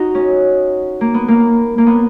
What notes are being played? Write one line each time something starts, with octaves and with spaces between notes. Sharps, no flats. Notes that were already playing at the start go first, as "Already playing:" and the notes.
Already playing: D#4 F#4
C#4
A#3
B3
A#3
A#3
B3